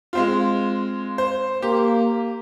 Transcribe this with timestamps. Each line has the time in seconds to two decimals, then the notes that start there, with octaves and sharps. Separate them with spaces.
0.13 G#3 C4 F4
1.18 C5
1.62 A#3 G4